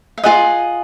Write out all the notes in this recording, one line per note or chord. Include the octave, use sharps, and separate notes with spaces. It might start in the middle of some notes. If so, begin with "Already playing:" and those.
F5
F4 G#4 D#5 F#5